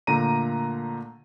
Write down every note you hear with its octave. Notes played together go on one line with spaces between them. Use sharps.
A#2 D3 A3 A#5 D#7